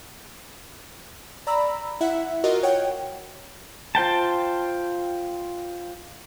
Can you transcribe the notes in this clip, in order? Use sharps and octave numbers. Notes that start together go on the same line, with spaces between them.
D5 A#5 B5 E6
E4 E5 F#5
F4 F#4 A#4 D#5
C#5 F#5 G5
F4 C5 G5 A5